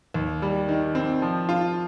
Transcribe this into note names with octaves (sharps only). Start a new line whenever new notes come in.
D#2
G3
D#3
C4
F3
F4